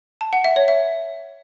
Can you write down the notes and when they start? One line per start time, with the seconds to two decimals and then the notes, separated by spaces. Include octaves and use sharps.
0.21 A5
0.33 F#5
0.44 E5
0.56 C#5
0.68 E5